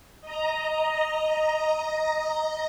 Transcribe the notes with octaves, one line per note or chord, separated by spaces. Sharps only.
D#5 A#5